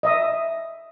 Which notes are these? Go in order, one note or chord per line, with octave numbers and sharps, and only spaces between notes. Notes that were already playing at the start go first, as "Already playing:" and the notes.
D#5 E5 D#6